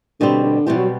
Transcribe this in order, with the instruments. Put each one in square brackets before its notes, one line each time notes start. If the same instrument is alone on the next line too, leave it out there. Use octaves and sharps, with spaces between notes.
[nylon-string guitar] B2 G3 C4 G4 [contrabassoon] D3
[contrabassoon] D3
[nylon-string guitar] B2 G3 C4 G4 [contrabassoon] E3
[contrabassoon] F#3